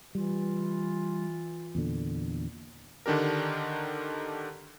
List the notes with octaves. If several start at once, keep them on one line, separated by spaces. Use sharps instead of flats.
E3 G3 F4
E2 A#2 D3
D3 D#3 D4 G4 A#4